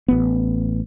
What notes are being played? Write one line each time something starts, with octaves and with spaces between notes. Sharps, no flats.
A1 B3